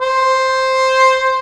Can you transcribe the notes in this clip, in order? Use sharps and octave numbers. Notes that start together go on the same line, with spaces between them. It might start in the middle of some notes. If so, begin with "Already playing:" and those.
C5